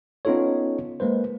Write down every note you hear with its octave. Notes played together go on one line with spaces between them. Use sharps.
B3 C#4 D#4 F4 A4 C#5
G#3 A#3 B4 C5